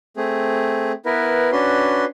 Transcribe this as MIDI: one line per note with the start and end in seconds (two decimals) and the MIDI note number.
0.17 0.92 57
0.17 0.92 60
0.17 0.92 68
1.06 1.50 59
1.06 1.50 64
1.06 1.50 70
1.06 1.50 71
1.52 2.05 61
1.52 2.05 62
1.52 2.05 66
1.52 2.05 71
1.52 2.05 84